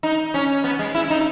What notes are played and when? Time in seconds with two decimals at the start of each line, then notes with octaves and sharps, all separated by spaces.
0.03 D#4
0.34 C#4
0.64 B3
0.79 G#3
0.95 E4
1.10 D#4